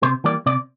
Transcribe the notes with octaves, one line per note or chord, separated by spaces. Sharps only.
C3 C5
E3 G3 A#3 D5
C3 D5